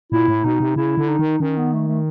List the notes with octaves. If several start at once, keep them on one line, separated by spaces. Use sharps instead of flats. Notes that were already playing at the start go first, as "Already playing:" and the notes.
A#2 E4
A2
B2 D#4
C3
C#3 E4
D3
D#4
D#3
D#3 C#4
B3
A3
A3